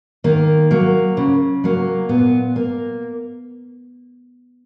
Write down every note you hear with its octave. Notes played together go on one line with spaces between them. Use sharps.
D#3 A#3
F#3 A#3
C#3
F#3 A#3
A#2 B3
A#3